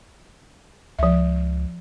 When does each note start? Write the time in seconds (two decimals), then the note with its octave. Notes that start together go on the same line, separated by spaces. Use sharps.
0.99 C#2 F3 E5